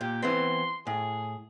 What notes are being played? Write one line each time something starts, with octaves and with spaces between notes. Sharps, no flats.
A#2 G4
E3 B3 C4 C6
A2 G#4